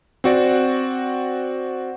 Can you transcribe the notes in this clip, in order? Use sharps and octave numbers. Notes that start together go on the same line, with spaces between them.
C4 F#4 D5